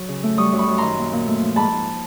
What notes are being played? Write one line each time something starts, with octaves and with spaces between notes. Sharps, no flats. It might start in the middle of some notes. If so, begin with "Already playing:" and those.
Already playing: F#3
C#3
A3
G3 C#6 D#6
F#2
B5 C#6
F#2
D#3 A#5 C6
A#2
A#2
A3
F3
G#2 A5 B5
G#2